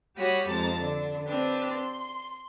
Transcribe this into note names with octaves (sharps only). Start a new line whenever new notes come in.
G3 F#4 G4 C#5 B5 D#6
F2 G#3 A5 A#5 A6
D3 D4
C4 D4 G4 B4
C6